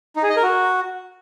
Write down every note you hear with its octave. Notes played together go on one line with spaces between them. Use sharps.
D#4
G#4
D#5
A#4
F#4